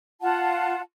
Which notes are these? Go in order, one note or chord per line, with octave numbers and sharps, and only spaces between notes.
F4 F#5 A5